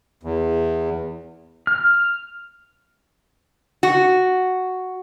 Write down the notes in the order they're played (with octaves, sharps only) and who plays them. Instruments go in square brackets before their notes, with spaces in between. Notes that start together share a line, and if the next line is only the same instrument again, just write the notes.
[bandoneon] E2
[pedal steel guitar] F6
[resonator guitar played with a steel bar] F#4